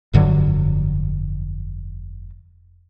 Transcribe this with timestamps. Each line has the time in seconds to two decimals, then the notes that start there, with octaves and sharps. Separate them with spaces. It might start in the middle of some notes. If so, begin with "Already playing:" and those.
0.13 F1 G2 D3 F#3